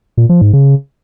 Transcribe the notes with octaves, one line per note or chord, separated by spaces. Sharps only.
A#2
F3
G#2
C#3